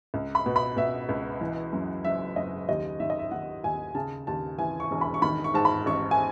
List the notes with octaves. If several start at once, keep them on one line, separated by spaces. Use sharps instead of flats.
C#2
B5
B2
B5
B2 E5
C#2
E3
F#2
F#1 E5
F#1 D#5
D#2 D#5
D#3 E5
D#5
E5
D#3 F#5
D#2 G#5
C#3 A5
D#2 A5
E3 G#5
C#6
E1
B5
C#6
D#3 B5
C#6
G#2 A5
B5
A1 C#6
G#5